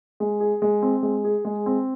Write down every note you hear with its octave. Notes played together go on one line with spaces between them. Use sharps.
G#3
G#4
G#3
C4
G#3
G#4
G#3
C4